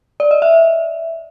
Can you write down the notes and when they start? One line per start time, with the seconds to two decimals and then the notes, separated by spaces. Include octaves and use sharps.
0.20 D5
0.31 D#5
0.42 E5